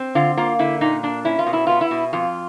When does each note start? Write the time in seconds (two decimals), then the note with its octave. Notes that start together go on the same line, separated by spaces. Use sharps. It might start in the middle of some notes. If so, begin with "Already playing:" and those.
Already playing: C4
0.15 D3 F4
0.37 A#3 F4
0.59 D3 E4
0.81 A#2 D#4
1.03 A#3 D4
1.25 C#4 E4
1.39 F4
1.47 B2
1.53 E4
1.67 B3 F4
1.81 E4
1.91 B2
2.13 F2 F4